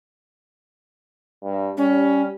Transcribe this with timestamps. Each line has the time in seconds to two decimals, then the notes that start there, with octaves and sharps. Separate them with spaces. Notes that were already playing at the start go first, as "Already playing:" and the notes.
1.43 G2
1.77 G3 C#4